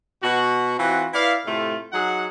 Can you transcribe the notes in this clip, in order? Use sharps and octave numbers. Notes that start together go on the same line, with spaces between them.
B2 F#4
E3 C4 F4 F#4
E4 B4 D5 F5
A2 C3 A3 F4
F#3 D#4 G#4 F#5